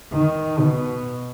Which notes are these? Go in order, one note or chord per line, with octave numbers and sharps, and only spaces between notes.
D#3
B2